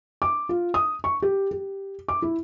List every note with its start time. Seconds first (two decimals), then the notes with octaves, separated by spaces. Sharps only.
0.22 D6
0.49 F4
0.74 D#6
1.04 C#6
1.22 G4
1.51 G4
2.08 D6
2.22 E4